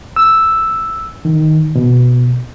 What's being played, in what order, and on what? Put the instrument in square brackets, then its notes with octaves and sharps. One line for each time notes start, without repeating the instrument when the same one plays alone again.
[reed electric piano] E6
D#3
B2